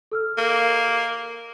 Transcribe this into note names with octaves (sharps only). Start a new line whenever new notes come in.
A4 E6 F6
A#3